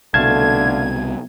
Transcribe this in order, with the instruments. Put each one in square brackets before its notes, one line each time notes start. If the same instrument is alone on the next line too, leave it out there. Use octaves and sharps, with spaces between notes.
[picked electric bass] C2 B2 [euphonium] D3 [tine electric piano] A3 F5 A5 [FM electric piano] G#6